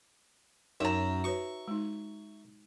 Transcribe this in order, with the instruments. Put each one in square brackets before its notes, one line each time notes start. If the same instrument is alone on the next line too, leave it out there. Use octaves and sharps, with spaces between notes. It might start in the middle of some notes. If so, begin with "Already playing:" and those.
[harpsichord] F#2 [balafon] D#4 C#5 [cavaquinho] E5 A#5
[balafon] F#4 B4 C#5 [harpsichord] C#6
[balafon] G#3 D#4